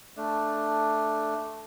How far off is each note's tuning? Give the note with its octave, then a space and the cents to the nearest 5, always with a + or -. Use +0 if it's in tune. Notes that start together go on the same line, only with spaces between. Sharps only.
A3 +0 D4 +0